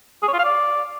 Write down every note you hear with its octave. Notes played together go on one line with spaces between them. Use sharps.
G#4
C#5
F4
F5
D5